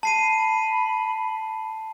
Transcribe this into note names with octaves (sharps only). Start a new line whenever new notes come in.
A5 B5 C7 D#7